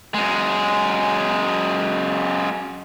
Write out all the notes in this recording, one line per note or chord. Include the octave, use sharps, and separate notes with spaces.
F#2 G#3